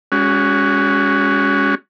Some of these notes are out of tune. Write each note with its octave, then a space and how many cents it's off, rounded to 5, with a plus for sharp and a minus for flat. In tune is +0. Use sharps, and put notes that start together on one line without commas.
G#3 -30 C#4 +20 F#4 +0